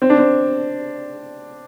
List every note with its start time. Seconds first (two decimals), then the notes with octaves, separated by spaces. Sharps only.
0.02 C4
0.10 D4
0.18 C4